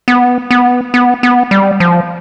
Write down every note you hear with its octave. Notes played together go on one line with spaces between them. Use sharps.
B3
B3
B3
B3
G3
F3